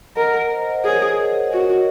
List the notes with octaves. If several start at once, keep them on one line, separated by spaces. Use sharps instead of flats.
A#4 D#5 F#5
D#5 F#5
C5 D#5
C5 D#5
G#4 A#4 C#5
D#5
F#4 A#4 C#5